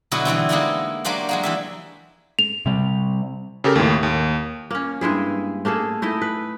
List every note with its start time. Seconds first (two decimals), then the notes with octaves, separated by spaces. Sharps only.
0.12 B2 D3 F#3 B3 E4 F#4
0.25 D3 E3 G3 C4
0.49 G#3 A#3 B3 D#4 E4
1.05 F#3 A#3 D4 G4 C5
1.29 F#3 G#3 A#3
1.43 E3 G4 E5
2.39 F7
2.66 C3 G3
3.64 C#3 G4 A4 A#4
3.76 D#2 A2
4.03 D#2
4.71 A#3 C#4
5.01 G2 G#3 E4 G#4
5.65 A3 A#3 G#4 A4
6.02 A3 D#4 E4 D#5
6.22 B4